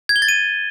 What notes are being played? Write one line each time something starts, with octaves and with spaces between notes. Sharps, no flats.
G#6
G7
A6
D#7